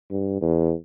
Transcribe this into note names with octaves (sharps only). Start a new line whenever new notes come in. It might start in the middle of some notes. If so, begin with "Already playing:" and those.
G2
E2